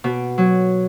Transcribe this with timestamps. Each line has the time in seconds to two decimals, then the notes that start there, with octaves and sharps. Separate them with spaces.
0.04 B2
0.38 F#3